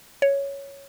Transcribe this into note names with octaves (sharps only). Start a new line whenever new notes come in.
C#5